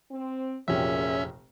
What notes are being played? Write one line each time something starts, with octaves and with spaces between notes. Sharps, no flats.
C4
F1 A#1 F#2 A#2 C#4 G4 G#4 E5